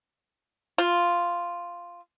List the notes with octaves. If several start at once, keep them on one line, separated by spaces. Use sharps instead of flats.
F4